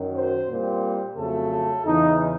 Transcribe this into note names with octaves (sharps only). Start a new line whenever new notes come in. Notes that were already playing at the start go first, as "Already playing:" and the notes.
Already playing: F#2 D#3 F#3
C5
A#2 G3 C4
F2 C#3 F#3 A3 A4
E2 C#3 E3 D#4